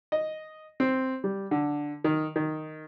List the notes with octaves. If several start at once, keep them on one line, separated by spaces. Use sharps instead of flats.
D#5
C4
G3
D3
D#3
D#3